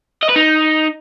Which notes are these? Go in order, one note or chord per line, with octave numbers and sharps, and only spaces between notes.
D#5
B4
D#4